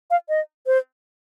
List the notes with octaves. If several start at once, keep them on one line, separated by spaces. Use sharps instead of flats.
F5
D#5
C5